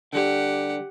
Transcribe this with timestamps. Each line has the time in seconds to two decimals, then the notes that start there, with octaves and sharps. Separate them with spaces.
0.13 D3 G3 G4 F#5